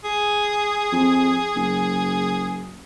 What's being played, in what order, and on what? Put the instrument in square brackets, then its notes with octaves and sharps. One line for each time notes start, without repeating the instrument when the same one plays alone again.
[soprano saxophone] G#4
[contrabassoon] F2
F#1